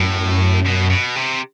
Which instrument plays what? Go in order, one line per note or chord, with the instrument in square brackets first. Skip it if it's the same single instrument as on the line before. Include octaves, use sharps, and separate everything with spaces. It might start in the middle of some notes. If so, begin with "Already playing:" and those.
Already playing: [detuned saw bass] F#2 [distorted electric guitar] A2
[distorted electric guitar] B2
B2
C3